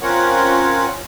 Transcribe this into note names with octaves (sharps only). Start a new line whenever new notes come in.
C4 C#4 F4 A#4 C#5 F#5